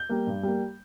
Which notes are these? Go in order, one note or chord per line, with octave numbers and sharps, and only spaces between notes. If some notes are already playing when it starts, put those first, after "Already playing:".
Already playing: G6
G3 A#3
G2
G3 A#3